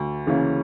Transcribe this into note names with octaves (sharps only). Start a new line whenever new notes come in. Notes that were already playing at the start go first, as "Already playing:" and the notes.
Already playing: D2
C#3 E3 A#3 C#4